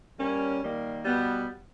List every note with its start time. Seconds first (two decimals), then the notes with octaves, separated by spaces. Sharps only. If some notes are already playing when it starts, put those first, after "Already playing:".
0.18 G3 A#3 C#4
0.61 D#3 G3 A#3
1.05 B2 G3 B3